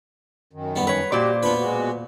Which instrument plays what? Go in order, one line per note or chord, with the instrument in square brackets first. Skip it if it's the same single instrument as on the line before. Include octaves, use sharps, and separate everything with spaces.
[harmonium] F#2 D#3
[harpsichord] G3 B3
[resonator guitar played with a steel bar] B4 C#5 [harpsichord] A#5
[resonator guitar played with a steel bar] A#2 C5 D5 [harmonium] F#4 G4
[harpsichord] B3 B4 [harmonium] D4 F4
[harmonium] B2 G#3 F#4